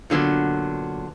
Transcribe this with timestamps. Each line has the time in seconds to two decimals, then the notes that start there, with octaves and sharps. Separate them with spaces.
0.10 A#2 D3 F#3 B3